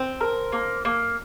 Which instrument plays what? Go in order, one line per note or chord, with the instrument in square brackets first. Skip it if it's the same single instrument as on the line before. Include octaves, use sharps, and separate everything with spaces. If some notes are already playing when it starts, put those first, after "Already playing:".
Already playing: [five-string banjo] C4
[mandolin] A#4
A#3
A#3